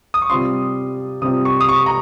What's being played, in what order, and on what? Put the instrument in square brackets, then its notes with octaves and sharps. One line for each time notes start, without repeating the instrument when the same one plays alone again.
[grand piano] D#6
C#6
[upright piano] C3 G3 C4 F4 [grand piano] C6
[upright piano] C3 G3 C4 F4 [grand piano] D#6
[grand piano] C#6
D#6
C#6
A#5